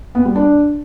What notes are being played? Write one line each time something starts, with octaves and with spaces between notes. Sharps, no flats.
B3
G3
D4